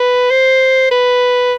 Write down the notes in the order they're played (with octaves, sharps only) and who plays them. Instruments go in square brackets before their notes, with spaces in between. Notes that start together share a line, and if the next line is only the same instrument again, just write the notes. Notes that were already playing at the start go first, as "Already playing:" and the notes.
Already playing: [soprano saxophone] B4
C5
B4